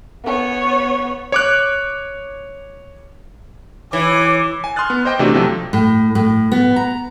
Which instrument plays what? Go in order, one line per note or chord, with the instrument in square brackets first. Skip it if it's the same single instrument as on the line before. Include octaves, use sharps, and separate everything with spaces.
[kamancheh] B3 C#5
[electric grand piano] C#5 D6 F#6
[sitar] E3 [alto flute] C#5 [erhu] D6
[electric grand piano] G#5
C6 D#6 F6 F#6 A6
B3
C5 D#5 G5 D6
C3 E3 A3 C4 D4 F#4
C3 F3 F#3 A3
[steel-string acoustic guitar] A2
A2
B3
A#5